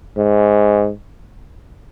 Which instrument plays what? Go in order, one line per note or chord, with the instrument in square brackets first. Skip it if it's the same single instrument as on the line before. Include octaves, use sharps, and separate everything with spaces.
[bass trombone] G#2